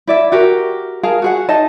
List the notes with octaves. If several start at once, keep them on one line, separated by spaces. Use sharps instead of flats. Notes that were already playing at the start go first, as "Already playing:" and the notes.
E4 D5 E5
F#4 G4 A#4 G5
G#4 A#4 F5 A5
F#4 G#4 F#5
D#4 D#5 E5 A5